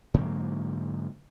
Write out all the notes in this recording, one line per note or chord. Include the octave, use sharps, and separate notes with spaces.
G#2 D3 F#3 A#3